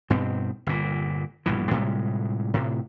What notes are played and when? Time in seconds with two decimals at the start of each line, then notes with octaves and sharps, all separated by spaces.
0.10 G2 B2 C4
0.67 G1 A#2
1.46 A#1 G2 B2 E3
1.71 A2 C3 G3 G#3
2.54 A2 C3